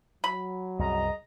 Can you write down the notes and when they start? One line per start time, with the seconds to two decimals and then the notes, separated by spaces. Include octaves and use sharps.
0.24 F#3 B5
0.79 C2 F#2 G#3 D#5 A#5